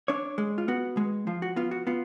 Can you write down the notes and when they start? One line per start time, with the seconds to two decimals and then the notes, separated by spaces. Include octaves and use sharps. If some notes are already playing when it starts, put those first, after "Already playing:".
0.08 D4 C#5
0.38 G#3
0.58 F4
0.68 B3 F#4
0.97 G#3
1.27 F3 F4
1.42 F#4
1.56 B3 F4
1.71 F#4
1.87 B3 F4